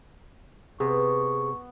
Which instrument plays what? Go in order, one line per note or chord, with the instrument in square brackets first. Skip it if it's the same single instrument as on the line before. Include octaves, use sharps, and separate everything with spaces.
[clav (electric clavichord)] C3 [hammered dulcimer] B3 [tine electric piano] G#4 [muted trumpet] C#6